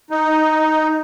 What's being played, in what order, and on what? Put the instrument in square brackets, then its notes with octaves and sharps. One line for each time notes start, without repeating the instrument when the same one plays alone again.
[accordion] D#4